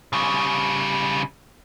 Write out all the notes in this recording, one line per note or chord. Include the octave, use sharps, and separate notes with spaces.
C#3 G3